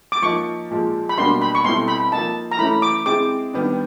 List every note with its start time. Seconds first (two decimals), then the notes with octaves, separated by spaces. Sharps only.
0.12 D6
0.22 F3 A#3 D#4 C#6
0.71 A#2 F3 G#3
1.09 B5
1.18 B2 G3 A#3 D4 F#4 C6
1.42 B5
1.55 C#6
1.64 B2 G3 C4 E4 A4 C6
1.88 B5
2.12 F3 A#3 D#4 A5
2.51 A#5
2.59 E3 A3 C#4 E4 B5
2.82 D6
3.06 G#3 C4 E4 G#4 D6
3.53 D#3 G3 B3 D4